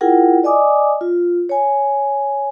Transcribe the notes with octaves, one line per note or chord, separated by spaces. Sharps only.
E4 F4 G#4 A#4 F#5 G5
D5 D#5 G#5 D6 D#6
F4
C#5 G#5